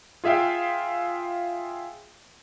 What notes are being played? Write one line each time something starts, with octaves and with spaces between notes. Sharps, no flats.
F4 G#4 E5 F5 G5